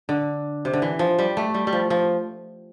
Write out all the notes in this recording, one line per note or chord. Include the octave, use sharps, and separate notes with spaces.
D3
C3
D3
E3
F3
G3
A3
G3
G3
F3
F3